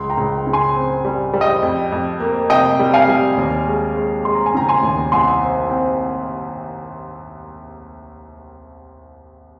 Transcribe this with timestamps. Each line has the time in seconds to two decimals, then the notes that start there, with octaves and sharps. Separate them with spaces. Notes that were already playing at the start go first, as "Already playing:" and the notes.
Already playing: C#2 C6
0.10 G5 A#5
0.17 C#2
0.47 C#3
0.53 G#5 C6
0.75 C4
1.05 G3
1.33 G3
1.41 D#5 G5
1.62 F2
1.92 F2
2.20 A#3
2.50 C3 D#5 G5
2.79 G3
2.94 F5 G#5
3.08 G3
3.37 D#2
3.67 G#3
3.96 G#3
4.25 G#3 C6
4.35 A#5
4.46 G#5
4.55 C#3 G5 A#5
4.69 G#5 C6
4.83 D#2
5.12 C2 G#5 C6
5.42 C4
5.70 C4